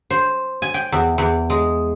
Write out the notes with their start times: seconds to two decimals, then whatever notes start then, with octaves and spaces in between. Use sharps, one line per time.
0.10 C5
0.62 G#5
0.74 G5
0.92 E2
1.18 E2
1.50 G#3